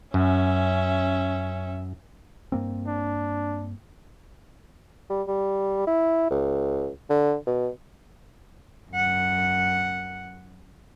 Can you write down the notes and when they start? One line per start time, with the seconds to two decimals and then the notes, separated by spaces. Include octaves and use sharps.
0.14 F#2 C#4 E5
2.52 G2 A#3 C4
2.87 D4
5.10 G3
5.27 G3
5.87 E4
6.31 C#2
7.10 D3
7.47 B2
8.91 F#2 F#5